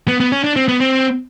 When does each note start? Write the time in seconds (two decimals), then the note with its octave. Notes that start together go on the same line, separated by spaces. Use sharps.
0.08 B3
0.20 B3
0.32 C#4
0.44 D4
0.56 C4
0.68 B3
0.80 C4